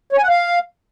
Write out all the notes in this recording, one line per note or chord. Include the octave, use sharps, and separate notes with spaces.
C#5
G#5
F#5
F5